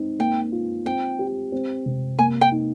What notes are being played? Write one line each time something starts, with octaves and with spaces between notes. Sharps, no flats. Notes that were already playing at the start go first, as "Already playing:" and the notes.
Already playing: C4 D#4
A#3 G5
F4
C4 G5
G4
C4
C3
A#3 G#5
G5
D#4